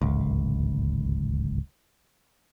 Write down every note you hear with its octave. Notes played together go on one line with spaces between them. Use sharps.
D1 G#1 C#2